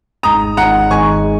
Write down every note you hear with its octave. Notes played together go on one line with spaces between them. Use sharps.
G#1 G#2 G#3 D#4 A#5 D#6
G#1 G#2 G#3 D#4 F#5 A#5
G#1 G#2 G#3 D#4 G#5 C#6
G#3